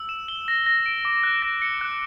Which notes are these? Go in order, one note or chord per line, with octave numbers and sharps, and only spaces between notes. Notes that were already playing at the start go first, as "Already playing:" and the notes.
Already playing: E6
E7
G7
A#6
A#6
D7
D6
F#6
A#6
C#7
F#6